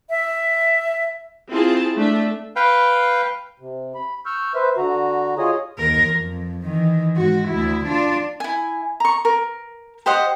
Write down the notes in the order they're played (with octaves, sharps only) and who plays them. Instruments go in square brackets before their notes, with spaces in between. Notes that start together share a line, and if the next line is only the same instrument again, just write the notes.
[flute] E5
[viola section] C4 E4 F4 G#4 A5
A3 D4 E5
[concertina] B4 F5 G5
[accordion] C3
B5
C#6 E6 F6 G6
B4 C5 E5
D3 F#4 A#5
F4 G#4 C#5 D#5 G#5 D#6
[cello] D#2 A#4
F2
D#3 E3
G#2 F#4
D2 E4
D4 F4
[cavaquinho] E4 G#5
A#5 C#6
A#4
G4 C5 D#5 F#5